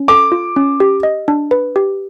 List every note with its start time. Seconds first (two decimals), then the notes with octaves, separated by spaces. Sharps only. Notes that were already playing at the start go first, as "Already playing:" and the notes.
Already playing: C#4
0.08 A4 D6
0.32 F4
0.56 C#4
0.80 G4
1.03 D#5
1.28 D4
1.51 B4
1.76 G4